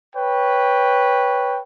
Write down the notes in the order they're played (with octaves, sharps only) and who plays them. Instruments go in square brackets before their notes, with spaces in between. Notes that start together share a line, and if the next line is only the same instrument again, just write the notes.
[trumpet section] B4 C#5 G5